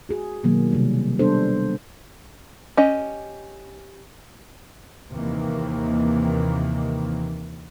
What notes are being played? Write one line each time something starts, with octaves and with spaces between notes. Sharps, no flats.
F#4 G#4
B2 D#3 F#3 A#3
C3 G3
G3 B3 D4 A4 C5
C#4 G4 D#5
D#2 C3 D#3 E3 A#3